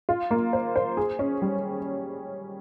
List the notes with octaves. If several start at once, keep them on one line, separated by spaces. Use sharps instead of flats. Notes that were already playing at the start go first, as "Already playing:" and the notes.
F4
A#3
C5
C5
G#4
C#4
G3